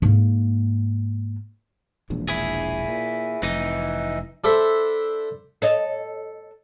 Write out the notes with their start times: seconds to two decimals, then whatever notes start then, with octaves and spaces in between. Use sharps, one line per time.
0.02 G#2 A#3
2.10 E1 A#1 E2
2.28 E4 G#4
2.88 A#2
3.43 F1 E3 D#4
4.44 D4 A4 C5 E5 B5
5.62 A4 C#5 D#5